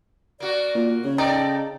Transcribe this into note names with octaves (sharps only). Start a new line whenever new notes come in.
A#3 F#4 D5
A#2
C#3 C#5
D#4 A4 D5 G5